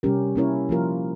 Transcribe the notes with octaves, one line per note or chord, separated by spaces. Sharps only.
C3 G3 C#4 G4 A#4
A#3 C#4 E4 A#4 C#5
F3 A#3 F4 A#4